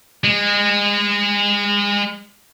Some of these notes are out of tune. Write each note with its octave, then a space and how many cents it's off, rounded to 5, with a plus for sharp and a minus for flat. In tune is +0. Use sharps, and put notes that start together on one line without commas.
G#3 -30